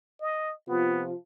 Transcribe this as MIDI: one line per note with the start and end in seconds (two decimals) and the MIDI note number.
0.20 0.53 75
0.68 1.12 48
0.68 1.12 53
0.68 1.03 59
0.68 1.12 65